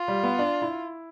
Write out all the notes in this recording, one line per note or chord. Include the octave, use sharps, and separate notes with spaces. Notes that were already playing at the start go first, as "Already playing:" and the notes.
Already playing: F4
G3
B3
D4
E4